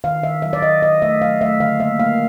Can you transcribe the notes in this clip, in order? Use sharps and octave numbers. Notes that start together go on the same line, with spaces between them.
D#3 F5
D#3 E5
F#3 E5
D5
D#3 D#5
D#3 D#5
A3 E5
F#3 F5
A3 E5
D3 F5
A#3 E5
A#3 F5